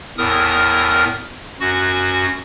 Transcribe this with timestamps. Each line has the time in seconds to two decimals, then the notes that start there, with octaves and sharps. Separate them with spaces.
0.18 E2 A2 A#4 D#6 F6
1.60 F#2 F#4